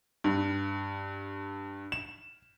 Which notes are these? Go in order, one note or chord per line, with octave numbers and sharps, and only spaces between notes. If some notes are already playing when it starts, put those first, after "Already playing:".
G2
E7